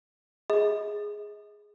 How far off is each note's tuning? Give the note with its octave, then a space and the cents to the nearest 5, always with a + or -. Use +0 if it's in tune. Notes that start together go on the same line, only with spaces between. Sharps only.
G#4 +0 D#5 +35